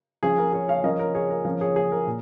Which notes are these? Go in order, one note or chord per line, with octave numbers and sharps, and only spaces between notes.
F3 C#4 G#4 C#5
A#4
G#4 C#5
C#5 F5
F3 C#4 A#4 D#5
A#4
G#4 C#5
A#4
F3 C#4 A#4
G#4 C#5
G#4
A#4
A#2